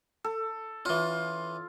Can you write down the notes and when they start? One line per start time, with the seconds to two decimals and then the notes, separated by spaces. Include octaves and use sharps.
0.24 A4
0.85 E3 C#4 F4